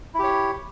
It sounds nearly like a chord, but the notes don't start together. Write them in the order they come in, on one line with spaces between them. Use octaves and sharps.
E4 G4 C#5